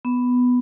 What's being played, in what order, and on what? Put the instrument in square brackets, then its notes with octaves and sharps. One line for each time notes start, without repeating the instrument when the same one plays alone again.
[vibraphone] B3